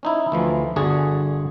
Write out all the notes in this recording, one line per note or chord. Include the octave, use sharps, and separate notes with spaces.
C#4 D#4 E4
D2 E3 F3
G1 D3 F#4 G#4 F#5